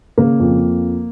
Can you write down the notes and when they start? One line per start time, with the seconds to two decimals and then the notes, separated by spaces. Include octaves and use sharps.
0.17 C#3 A#3
0.39 F2